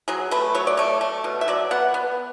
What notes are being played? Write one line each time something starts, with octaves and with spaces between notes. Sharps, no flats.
F#3 G#4
A3 B4
F#3 C#5
D5
A3 C#5
A3
B2
E5
F#3 D5
B3 F#5
B3